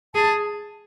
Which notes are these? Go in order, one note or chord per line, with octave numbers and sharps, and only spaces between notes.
G#4 A5